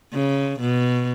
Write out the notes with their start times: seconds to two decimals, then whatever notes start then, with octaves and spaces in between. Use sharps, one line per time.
0.13 C#3
0.60 B2